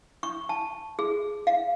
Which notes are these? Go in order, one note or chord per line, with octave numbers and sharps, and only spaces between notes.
C#6
A5
G#4
F5